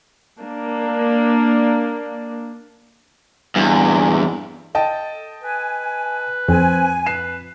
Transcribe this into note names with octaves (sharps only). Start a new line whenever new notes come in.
A#3 D4
E2 G2
A4 D#5 G5 A5
B4 G#5
F2 C4 G#5
B4 C7 E7